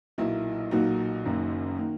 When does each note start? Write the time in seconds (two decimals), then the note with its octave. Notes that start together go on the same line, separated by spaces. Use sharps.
0.18 B1 A#2 F#3 A#3 E4
0.71 B1 A#2 F#3 A#3 D#4 F#4
1.25 F#1 F#2 D#3 A#3
1.79 D#3 A#3